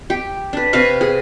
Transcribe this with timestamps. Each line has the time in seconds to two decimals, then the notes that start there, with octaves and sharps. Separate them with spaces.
0.10 G4
0.53 D4 B4
0.73 C3 B4 F5 C#6
1.01 G#4